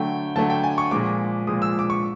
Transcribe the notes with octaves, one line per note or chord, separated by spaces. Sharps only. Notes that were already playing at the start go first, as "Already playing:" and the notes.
Already playing: D3 F#3 A3 G5
D3 F#3 A3 A5
G5
G#5
C#6
A#2 F3 G#3 D6
A#2 F3 G#3 D#6
E6
D6
C#6